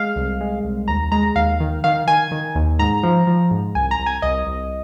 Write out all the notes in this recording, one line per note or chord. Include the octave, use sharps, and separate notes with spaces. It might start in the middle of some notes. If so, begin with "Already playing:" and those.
Already playing: G#3 F5
C2
G#3
C2
D#2 A#5
G#3 A#5
D#2 F5
D#3
D#3 F5
D#3 G#5
D#3
D#2
G#2 A#5
F3
F3
G#2
C2 G#5
A#5
C2
G#5
C2 D#5
C2